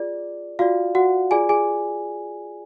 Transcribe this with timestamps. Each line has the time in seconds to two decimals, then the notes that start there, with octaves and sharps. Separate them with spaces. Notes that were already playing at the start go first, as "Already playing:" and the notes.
Already playing: F4 G#4 D5
0.59 F4 F#4 D5 F5
0.95 F#4 F#5
1.31 F4 G#4 D5 G#5
1.49 G#4 G#5